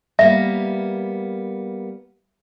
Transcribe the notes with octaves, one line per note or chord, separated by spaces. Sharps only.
G3 A#3 B3 E5